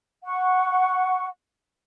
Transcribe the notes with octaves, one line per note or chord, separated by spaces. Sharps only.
F#5 C#6